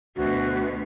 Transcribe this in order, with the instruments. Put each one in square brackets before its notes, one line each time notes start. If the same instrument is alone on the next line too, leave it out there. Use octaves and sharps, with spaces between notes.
[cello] D2 B2 [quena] F#4